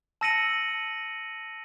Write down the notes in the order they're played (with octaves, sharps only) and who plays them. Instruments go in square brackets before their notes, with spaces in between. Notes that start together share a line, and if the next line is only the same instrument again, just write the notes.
[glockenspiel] A5 E6 A#6 C#7 D#7 F#7